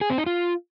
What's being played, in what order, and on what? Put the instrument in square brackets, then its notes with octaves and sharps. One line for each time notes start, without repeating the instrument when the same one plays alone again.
[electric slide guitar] G#4
C4
D#4
F4